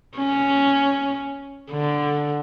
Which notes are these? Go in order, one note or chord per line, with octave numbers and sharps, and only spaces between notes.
C#4
D3